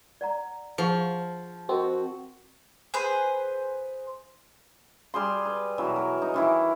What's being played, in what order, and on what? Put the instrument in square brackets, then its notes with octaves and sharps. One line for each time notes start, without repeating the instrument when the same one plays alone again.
[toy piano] D5 F#5 A#5
[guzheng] F3 [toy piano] G#4 F#5 C#6
[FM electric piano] C4 [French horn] F#4 [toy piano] A#4 D#5
[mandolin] G#4 B4 C5
[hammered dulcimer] G3 G#4 C6
B4
B2 E3 F#3
A#4
D#4
D#3 E3 E4